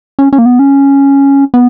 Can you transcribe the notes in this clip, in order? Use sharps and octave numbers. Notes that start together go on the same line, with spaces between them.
C#4
C#4
A#3
B3
C#4
B3